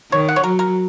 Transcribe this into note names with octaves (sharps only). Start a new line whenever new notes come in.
D#3 C#5
F#5
C#5
F#3 A#4
A#4